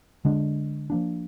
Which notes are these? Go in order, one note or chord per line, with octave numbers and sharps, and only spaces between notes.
D3 G#3 D4
F3 A#3 D4